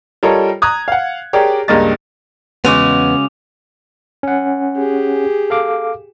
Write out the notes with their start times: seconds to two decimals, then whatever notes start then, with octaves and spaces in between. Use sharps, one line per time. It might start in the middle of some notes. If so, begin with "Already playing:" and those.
0.23 G3 F4 A4 A#4 C#5 D#5
0.62 A#5 D#6 F#6 G#6
0.88 F5 F#5
1.33 G4 G#4 A#4 C#5 D5
1.68 C#2 G2 G#3 A#3 D#5 A6
2.65 E2 C#3 G#3 B3 F#4 D6 F7
4.23 C#4 F#5
4.77 G4 G#4
5.50 A4 F5 D6